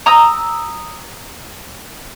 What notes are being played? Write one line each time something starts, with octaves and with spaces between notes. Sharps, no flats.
A#5 D#6 E6